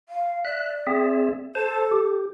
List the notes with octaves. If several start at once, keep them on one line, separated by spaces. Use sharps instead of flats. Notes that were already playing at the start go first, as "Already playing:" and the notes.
F5
D5 E5 F#6
C4 G#4 E5
A4 C5 A5
G4